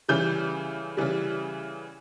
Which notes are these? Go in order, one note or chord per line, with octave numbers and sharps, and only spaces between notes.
C#3 E3 G3 G6
C#3 E3 G3